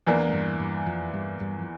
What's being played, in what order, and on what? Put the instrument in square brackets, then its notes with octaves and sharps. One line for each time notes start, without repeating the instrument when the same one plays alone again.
[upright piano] E2 E3 A#3 D4
[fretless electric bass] A3
G2 G3
G2 G3
F2 F3
G2 G3
G2 G3
F3